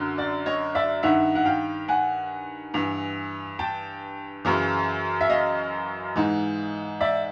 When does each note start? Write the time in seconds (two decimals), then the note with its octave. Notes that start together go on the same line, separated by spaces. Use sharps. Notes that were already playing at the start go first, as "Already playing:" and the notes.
Already playing: F#2 D3
0.18 D5
0.46 C#5 D#5
0.75 D5 E5
1.03 G2 D#3 E5 F#5
1.35 F#5
1.45 F5 G5
1.88 F#5 G#5
2.74 G2 E3
3.59 G5 A5
4.45 F#2 C#3 E3
5.21 E5
5.30 D#5 F5
6.16 G#2 E3
7.01 D5 E5